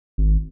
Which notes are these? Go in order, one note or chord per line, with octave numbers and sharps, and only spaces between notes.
G#1